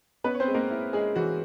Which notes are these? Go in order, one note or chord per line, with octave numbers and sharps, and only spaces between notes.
B3 C#4 B4
C#5
C4 C5
G#3
A#3 A#4
E4
G#3 C#4 G#4
E3 F#4